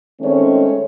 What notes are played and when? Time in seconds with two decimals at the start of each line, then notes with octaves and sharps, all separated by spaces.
0.21 D#3 G#3 A3 C4 C#4 C#5